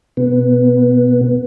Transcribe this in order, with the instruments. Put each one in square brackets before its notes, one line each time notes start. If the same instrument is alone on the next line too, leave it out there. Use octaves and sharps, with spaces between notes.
[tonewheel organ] B2 B3